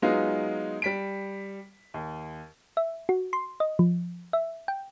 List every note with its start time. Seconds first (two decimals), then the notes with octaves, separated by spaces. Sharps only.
0.02 F#3 G#3 B3 D#4 F4
0.82 G3 B6 D7
1.94 D#2
2.77 E5
3.09 F#4
3.33 C6
3.60 D#5
3.79 F3
4.33 E5
4.68 G5